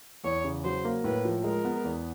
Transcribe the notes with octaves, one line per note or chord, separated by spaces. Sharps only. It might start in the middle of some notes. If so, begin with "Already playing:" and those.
E2 C#5
C#3
F#3 C5
A#3
A2 B4
F3
G#3 A#4
B3
E2